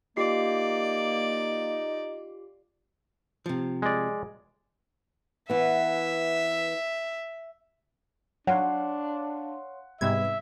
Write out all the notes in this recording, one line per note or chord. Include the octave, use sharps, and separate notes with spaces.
A#3 D#4 F4 G4 D5 C7
C3 F3
G#3 D5
E3 B3 E5
F#3 D4 C#5 F5 F#5 C6
G#2 C3 G3 B3 B4 E5 G#6